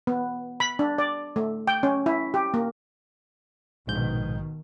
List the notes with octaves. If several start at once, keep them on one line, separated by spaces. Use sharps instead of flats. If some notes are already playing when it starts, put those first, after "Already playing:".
B3
B5
D4
D5
A3
G5
C#4
E4
G4
A#3
A#1 G#2 B2 D#3 G6